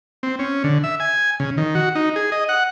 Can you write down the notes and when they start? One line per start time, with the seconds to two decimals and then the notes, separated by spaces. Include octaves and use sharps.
0.23 C4
0.39 C#4
0.64 D3
0.84 E5
1.00 G#5
1.40 C#3
1.57 D#3
1.75 F#4
1.95 D#4
2.16 G#4
2.32 D#5
2.49 F#5